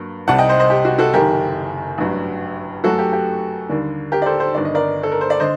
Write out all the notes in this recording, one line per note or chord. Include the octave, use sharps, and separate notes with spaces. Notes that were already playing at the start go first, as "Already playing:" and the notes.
Already playing: G2 F#3 A#3
C2 C3 G3 F#5 A5
D#5 G5
C5 D#5
C5 D#5
G4
F#4
F#4 A4
F#1 F#2 D#3 G4 A#4
A1 G2 F#3
F#2 F#3 A3 F#4 A4
G4
G4
D#2 D3 G3 A#3
G4 A#4
D5
A4 C5
A4 C5
G1 G2 D#3 D5
D#5
A#4 D5
A4
A#4
C5
D5
D3 C5 D#5